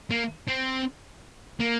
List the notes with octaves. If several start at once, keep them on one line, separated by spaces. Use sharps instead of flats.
A#3
C4
A#3